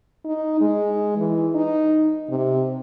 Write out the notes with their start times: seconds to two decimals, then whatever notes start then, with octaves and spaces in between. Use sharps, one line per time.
0.25 D#4
0.61 G#3
1.17 E3
1.55 D#4
2.29 C3